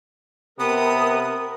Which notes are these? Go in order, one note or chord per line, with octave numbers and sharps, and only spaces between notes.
C3 B3 A#4 D#6